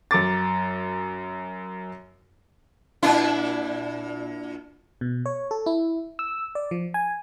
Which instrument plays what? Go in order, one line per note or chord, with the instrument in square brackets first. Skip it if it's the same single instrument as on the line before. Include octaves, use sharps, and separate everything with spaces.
[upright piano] F#2 A#5 D6 A6
[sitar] A#2 D4 E4
[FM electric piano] B2
C#5
A4
E4
E6
D5
F3
G#5